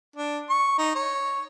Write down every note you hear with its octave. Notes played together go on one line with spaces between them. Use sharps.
D4
C#6
D#4
C#5